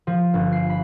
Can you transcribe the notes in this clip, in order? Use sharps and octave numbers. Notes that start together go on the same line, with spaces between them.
F3
G1
C7
B5